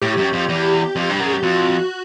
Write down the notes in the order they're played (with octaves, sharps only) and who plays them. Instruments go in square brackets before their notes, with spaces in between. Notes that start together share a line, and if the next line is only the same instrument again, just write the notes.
[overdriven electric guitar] A2 [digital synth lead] G4
[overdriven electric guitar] F#2
F2
E2
F2
G2
[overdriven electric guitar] F#2 [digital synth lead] G#4
[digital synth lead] G4
[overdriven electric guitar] F2 [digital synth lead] F#4